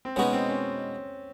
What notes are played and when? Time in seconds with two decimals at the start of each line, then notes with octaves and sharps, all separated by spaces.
0.05 C4
0.16 B2 G#3 B3 C#4 D#4 F#4
0.33 C4
0.49 C#4